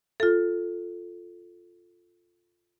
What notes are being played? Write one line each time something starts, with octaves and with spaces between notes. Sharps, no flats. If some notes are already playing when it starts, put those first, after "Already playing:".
F4 A4